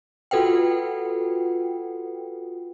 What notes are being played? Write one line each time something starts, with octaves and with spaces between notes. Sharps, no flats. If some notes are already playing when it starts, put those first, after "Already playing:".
F4 F#4 A4 B4 F#5 G5